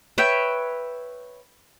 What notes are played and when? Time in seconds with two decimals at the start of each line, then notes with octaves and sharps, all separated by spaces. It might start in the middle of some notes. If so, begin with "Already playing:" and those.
0.18 B4 C#5 E5 G5